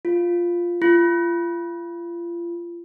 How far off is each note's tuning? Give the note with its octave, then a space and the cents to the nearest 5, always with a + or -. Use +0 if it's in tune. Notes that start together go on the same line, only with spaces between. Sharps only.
F4 +0
F4 -30